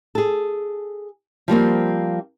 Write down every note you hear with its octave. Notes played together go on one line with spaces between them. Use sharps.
G#4 A4
F3 G3 A#3 C4